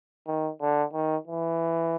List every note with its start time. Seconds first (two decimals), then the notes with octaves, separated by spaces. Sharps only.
0.27 D#3
0.61 D3
0.93 D#3
1.27 E3